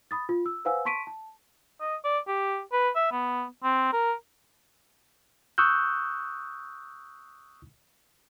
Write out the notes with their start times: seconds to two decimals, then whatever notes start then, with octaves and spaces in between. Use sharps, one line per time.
0.11 B5 D#6 A6
0.29 F4
0.46 E6
0.65 B4 C5 F5 F#5 G#5 E6
0.85 A5 C6 C#6 B6 D7 D#7
1.07 A5
1.81 D#5
2.04 D5
2.28 G4
2.73 B4
2.96 E5
3.12 B3
3.64 C4
3.93 A#4
5.58 C#6 D#6 E6 F#6 G6